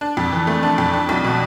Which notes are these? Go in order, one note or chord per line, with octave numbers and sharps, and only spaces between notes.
D4
F2
E3
A3
D4
F2
D4
B1
B2